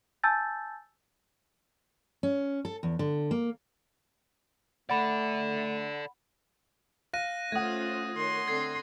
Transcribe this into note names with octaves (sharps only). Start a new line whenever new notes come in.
G#5 A5 E6 G6 A6
C#4
A4
E2
D3
A#3
A3 A4 D5 F#5 B5
F5 F#6 A#6 D#7
A3 C#4 F4 C5 F#5 D#6 G#6
D#3 C#5 C6
D3 C4 G#6 C7